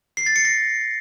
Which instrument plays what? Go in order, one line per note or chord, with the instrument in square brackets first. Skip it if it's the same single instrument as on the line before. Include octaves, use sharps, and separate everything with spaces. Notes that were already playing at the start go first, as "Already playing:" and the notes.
[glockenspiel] C7
A6
C#7
A#6